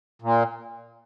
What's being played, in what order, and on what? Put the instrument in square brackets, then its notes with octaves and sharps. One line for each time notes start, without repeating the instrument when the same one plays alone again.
[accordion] A#2